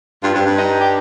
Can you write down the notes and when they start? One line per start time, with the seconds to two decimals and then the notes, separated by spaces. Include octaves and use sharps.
0.23 G2 F4
0.34 G2 C4
0.46 G2
0.58 D#4
0.81 G4